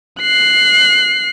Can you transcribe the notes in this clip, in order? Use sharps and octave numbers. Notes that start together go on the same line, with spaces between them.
F#6 C7